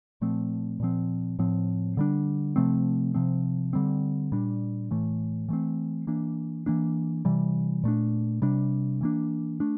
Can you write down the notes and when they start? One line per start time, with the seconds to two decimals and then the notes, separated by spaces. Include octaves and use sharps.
0.21 A#2 F3 A3 C4
0.80 A#2 F3 C4
1.39 A2 F3 C4
1.97 D3 G3 D4
2.56 C3 F3 A3 C4
3.14 C3 F3 C4
3.73 D3 G3 C4
4.32 A#2 G3 D4
4.91 A2 E3 A3
5.49 E3 A3 C4
6.07 E3 A#3 D4
6.66 E3 A#3 D4
7.25 C3 E3 G3
7.84 A#2 A3 D4
8.42 C3 G3 D4
9.01 E3 A#3 D4
9.60 A3 D4